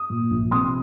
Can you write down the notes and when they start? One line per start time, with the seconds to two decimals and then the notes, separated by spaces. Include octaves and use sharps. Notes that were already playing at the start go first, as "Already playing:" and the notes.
Already playing: D#6
0.10 A#2
0.31 A#1
0.51 C3 C6 D#6